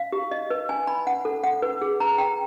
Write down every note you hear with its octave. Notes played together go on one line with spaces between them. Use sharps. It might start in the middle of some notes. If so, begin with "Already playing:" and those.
Already playing: F5
G4
D#5
B4
G#5
B5
F#5
A4
F#5
B4
G#4
A#5
G5